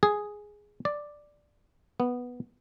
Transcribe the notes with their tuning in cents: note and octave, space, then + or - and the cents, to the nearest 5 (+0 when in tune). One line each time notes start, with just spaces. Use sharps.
G#4 +0
D5 +5
B3 -5